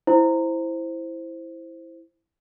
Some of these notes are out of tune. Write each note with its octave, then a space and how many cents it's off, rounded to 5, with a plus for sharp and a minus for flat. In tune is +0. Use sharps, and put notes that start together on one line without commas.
E4 +0 C5 +0